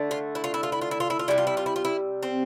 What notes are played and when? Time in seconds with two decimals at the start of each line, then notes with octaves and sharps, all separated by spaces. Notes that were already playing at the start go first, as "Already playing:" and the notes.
Already playing: D3 A3
0.11 F4
0.35 E4
0.44 F4
0.54 E4
0.63 F4
0.72 E4
0.81 F4
0.91 E4
1.00 F4
1.10 E4
1.19 F4
1.28 C3 E3 G3 E4
1.38 F4
1.47 E4
1.57 F4
1.66 E4
1.76 F4
1.85 E4
2.23 C4